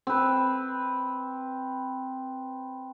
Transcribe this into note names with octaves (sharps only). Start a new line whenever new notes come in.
C4 B4